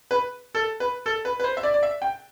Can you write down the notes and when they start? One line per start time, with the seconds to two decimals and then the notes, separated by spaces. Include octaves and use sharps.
0.11 B4
0.55 A4
0.80 B4
1.06 A4
1.25 B4
1.40 B4
1.44 C5
1.57 E5
1.63 D5
1.74 D5
1.83 E5
2.02 G5